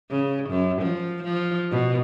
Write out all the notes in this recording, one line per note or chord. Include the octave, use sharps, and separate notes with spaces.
C#3
F#2
F3
F3
B2